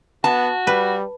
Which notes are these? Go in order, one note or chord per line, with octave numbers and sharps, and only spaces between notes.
B3 F#4 A5
G3 B4